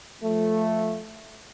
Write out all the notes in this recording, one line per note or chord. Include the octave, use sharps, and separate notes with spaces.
F3 A3